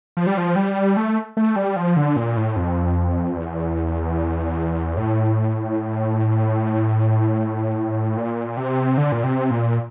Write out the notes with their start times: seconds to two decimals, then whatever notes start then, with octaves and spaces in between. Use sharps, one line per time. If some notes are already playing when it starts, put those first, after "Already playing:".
0.17 F3
0.27 G3
0.37 F3
0.56 G3
0.97 A3
1.37 A3
1.56 G3
1.76 F3
1.96 D3
2.16 A#2
2.37 A2
2.56 F2
3.36 E2
4.97 A2
8.17 A#2
8.57 C3
8.98 D3
9.12 A#2
9.24 C3
9.51 A#2